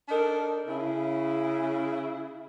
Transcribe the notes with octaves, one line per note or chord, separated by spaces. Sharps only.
D4 D#4 A4 A#4
C#3 E4